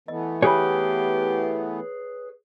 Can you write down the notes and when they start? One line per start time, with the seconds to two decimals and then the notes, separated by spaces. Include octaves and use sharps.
0.08 E3 A3 B3 D#5
0.43 G4 G#4 B4 C#5 G#5 B5